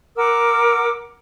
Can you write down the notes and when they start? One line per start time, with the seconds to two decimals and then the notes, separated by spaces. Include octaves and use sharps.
0.16 A#4 F#5 D6 E6